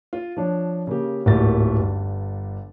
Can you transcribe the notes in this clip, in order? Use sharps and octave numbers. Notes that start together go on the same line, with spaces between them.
F4
F3 D4 C#5
C#3 A#3 G4
D1 G#1 A3 A#3 G4 A6
G1 G2